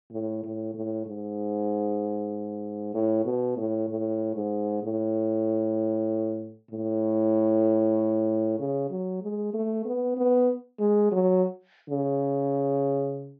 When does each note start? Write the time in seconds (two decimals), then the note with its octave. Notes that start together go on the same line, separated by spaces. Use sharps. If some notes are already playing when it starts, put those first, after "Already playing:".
0.12 A2
0.43 A2
0.74 A2
1.06 G#2
2.94 A2
3.25 B2
3.57 A2
3.89 A2
4.35 G#2
4.83 A2
6.71 A2
8.60 C#3
8.90 F#3
9.22 G#3
9.54 A3
9.85 B3
10.17 B3
10.79 G#3
11.12 F#3
11.90 C#3